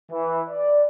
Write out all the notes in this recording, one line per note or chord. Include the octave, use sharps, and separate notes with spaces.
E3
D5